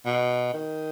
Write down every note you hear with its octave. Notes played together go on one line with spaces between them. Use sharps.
B2
D#3